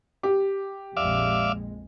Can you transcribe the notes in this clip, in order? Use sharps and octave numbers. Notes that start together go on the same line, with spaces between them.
G4
A#1 F2 G#3 D5 E5 F5